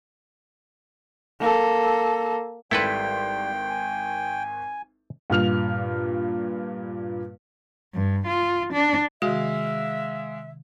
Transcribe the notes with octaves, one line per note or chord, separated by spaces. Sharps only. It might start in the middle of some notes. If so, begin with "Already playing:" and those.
A#3 A4
G#1 G3 E4 A4 B4 G5 C6
G#5
G2 A#2 F6 F7
G2
F4
D4
C3 D#3 G#3 F#4 E5 F5